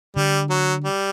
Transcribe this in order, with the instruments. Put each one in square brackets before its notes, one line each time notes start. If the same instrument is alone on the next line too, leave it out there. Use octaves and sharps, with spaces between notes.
[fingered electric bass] D3 [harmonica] G3
[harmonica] F#3
G3